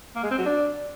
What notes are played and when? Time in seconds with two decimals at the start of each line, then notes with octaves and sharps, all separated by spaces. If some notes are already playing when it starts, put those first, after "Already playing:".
0.15 A#3
0.23 G#3
0.31 C4
0.38 F#3
0.46 D4